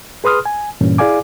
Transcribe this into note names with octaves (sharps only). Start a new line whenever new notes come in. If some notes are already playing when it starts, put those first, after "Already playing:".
G#4 B4 C6 D#6 F6
G#5
G2 A#2 E3 C#4
E4 G#4 D5 F5 G#5 D6